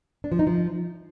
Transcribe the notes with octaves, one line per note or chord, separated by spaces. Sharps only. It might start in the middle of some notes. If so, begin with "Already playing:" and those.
D4
F3
D#4
F3